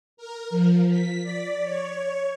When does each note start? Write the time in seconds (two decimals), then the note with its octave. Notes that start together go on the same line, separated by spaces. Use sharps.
0.17 A#4
0.50 F3
0.89 B6
1.23 D5
1.62 C#5